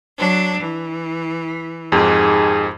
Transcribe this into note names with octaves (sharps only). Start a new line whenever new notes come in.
F#3 D4
E3
F2 G#2 D#3 G4 G#4